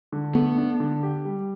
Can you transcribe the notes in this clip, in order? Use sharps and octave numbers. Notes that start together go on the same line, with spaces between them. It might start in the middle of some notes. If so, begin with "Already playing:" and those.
D3
A3 B3
D4
D3
G4
G3